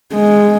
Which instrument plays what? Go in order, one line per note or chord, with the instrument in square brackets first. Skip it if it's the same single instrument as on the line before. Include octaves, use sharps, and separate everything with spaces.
[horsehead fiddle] G#3